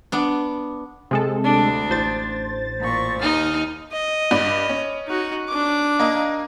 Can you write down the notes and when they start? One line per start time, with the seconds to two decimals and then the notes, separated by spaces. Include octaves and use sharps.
0.12 B3 D4
1.11 C3 G#3 A4
1.44 D2 D4
1.90 A1 C5 A6
2.80 A#2 C#6
3.21 D#2 D#4 F6
3.92 D#5
4.31 G2 D5 B5
4.69 C#4
5.07 D#4 F#4
5.48 D4 D6
5.99 A#3 D#5